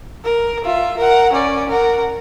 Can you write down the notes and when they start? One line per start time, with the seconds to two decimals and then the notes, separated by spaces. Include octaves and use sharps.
0.25 A#4
0.64 F4 E5
0.97 A#4 F#5
1.33 C#4 D5
1.69 A#4 F#5